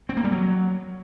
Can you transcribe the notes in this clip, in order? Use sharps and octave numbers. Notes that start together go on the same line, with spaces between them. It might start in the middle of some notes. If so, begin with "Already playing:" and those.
C4
A#3
G3
F#3